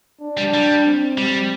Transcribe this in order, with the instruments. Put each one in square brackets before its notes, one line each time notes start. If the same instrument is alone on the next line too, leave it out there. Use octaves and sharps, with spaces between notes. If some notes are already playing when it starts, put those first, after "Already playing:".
[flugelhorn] D4
[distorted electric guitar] G3
G3
[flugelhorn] C4
[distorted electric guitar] G3